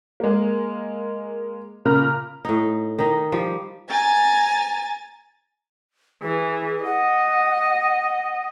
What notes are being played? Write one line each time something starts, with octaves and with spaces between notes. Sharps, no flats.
G#3 A#3
A#2 C#3 A#4 A#5 B5 F6
A2 D#4
D#3 D#4
F3 G3
G#5 A#5 A6
E3 G#4
D#5 F#5